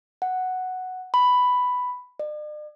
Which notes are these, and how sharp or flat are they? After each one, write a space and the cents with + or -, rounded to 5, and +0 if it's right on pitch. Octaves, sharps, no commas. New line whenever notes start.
F#5 +0
B5 +5
D5 +45